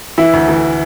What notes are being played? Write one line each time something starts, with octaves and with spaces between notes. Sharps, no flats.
E3 E4
D2
E3